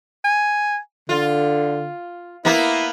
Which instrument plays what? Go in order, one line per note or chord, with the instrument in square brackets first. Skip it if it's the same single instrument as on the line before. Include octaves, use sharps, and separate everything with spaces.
[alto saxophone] G#5
[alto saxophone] D3 [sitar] F4
[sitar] A#3 B3 [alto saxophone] E4